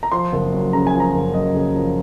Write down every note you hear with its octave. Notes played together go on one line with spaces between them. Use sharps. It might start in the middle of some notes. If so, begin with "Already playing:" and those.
A#5
F3 C6
F#1
F#2
C#3 A#5
G#5
F3
A#5
F#1
F#2 D#5
C#3
F3